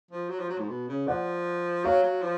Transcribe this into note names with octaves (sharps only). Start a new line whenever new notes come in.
F3
F#3
F3
F#3
G#2
B2
C#3
F3 D5 F#5
F#3 C#5 F5
F#3
F3